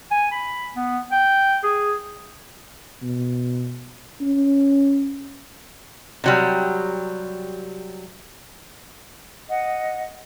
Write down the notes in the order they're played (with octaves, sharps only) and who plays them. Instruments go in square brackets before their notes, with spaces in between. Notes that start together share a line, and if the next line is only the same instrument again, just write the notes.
[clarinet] G#5
B5
B3
G5
G#4
[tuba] B2
C#4
[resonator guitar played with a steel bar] C3 F#3 G3
[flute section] D#5 F#5